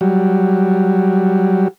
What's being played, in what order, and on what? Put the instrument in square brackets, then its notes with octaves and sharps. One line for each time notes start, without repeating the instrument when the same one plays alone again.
[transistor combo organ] F#3 G3